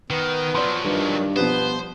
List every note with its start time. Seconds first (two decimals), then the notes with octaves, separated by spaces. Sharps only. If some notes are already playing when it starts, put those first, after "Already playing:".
0.10 D#3 B3
0.55 F3 F#3 D5 C6
0.84 G2 D#3 B4
1.36 B2 F3 G3 B3 C5